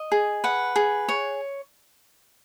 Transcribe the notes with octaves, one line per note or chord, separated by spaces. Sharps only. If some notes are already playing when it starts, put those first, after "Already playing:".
Already playing: D#5
G#4
B4 F#5
G#4
C#5